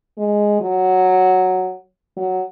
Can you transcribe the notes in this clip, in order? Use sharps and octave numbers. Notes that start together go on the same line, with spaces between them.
G#3
F#3
F#3